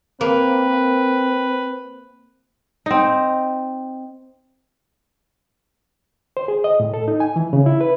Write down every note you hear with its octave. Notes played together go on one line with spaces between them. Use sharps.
A#3 C4 B4
C4 D#4
C5
G#4
D#5
A2
A4
D#4
G#5
E3
C#3
E4
B4